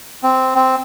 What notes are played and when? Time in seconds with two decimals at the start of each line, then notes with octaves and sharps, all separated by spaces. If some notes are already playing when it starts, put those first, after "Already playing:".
0.23 C4
0.55 C4